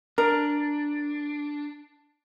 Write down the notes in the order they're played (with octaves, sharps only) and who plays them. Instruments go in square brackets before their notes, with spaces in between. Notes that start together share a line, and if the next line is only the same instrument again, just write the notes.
[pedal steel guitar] D4 [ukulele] A#4